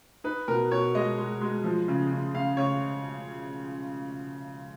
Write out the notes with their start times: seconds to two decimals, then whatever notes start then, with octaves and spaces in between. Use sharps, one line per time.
0.24 D#4 B4
0.48 B2 A#4
0.71 B2 C#5
0.95 G#3 D#5
1.18 G#3
1.41 G#3
1.64 F3
1.88 C#3
2.11 C#3
2.34 C#3 F5
2.57 C#3 C#5